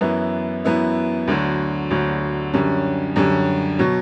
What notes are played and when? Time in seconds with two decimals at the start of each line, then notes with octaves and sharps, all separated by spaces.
0.01 F#2 E3 B3 E4
0.65 F#2 E3 B3 E4
1.27 D2 D3 F#3
1.90 D2 D3 F#3
2.53 F#2 D3 G3 C#4
3.16 F#2 D3 G3 C#4
3.79 B2 F#3